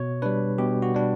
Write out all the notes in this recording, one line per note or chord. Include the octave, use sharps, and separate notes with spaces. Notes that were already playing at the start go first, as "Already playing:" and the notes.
Already playing: B2 C#5
G3 D4 B4
B2 G4
F#4
G3 D4